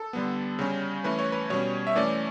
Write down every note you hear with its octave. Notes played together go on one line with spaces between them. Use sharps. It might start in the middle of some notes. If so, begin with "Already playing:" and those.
Already playing: A4
D3 G3 B3
C#3 G3 C#4
E3 A3 C#4 B4
C#5
B4
B2 G3 C#4 C#5
E5
E3 A3 C#4 D5